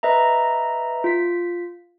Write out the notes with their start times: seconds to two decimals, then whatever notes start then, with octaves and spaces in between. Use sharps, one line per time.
0.03 B4 D#5 E5 A#5
1.04 F4 B6